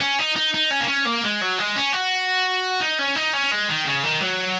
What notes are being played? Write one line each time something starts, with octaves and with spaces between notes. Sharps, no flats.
C#4
D#4
D#4
D#4
C#4
A#3
C#4
A#3
G#3
F#3
G#3
C#4
F#4
D#4
C#4
D#4
C#4
G#3
D#3
C#3
D#3
F#3